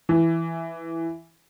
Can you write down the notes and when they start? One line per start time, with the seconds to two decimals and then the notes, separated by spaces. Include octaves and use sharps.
0.09 E3